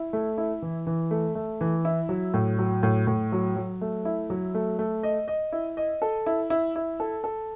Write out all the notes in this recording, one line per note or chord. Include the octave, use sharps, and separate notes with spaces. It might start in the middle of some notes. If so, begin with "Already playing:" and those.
Already playing: E4
A3
E4
E3
E3
A3
A3
E3
E4
F#3
A2
F#3
A2
A2
F#3
F#3
A3
E4
F#3
A3
A3
D#5
D#5
E4
D#5
A4
E4
E4
E4
A4
A4